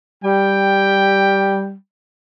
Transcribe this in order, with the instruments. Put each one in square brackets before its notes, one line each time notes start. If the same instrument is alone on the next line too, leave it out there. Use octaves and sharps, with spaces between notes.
[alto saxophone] G3 [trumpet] G5